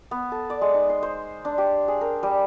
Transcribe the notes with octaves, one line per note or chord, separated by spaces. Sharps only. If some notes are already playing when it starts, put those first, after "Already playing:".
B3
A4
D5
G#3
D#4
C6
C5
D4
G4
G#4
A#4
G3